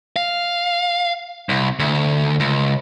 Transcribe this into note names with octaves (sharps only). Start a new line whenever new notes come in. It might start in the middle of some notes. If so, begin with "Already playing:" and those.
F5
C2
D2
C#2